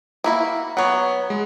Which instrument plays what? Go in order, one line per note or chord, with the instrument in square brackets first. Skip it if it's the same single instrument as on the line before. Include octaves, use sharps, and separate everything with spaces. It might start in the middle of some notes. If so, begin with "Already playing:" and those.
[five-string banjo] A#3 E4 F#4
[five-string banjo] F#3 B3 [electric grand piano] C#5 F#5
[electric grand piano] G#3